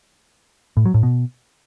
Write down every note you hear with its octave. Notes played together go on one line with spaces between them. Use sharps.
A2
F#3
A2
B2